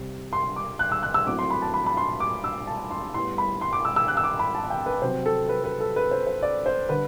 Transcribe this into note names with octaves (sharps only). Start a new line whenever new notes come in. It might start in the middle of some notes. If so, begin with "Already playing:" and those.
Already playing: C3 G3
C6
D6
F#6
E6
F#6
E6
A2 F#3 A3 C4 D6
C6
B5
A5
B5
B5
C6
D6
E6
A5
C6
A2 G3 B3 C6
B5
C6
D6
E6
E6
F#6
E6
D6
B5
A5
G5
B4
C3 F#3 C4 C5
A4
B4
B4
A4
B4
C5
C5
D5
C5
D3 G3 B4